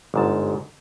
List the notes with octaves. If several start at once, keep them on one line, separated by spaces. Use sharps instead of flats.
G1 G#2 A5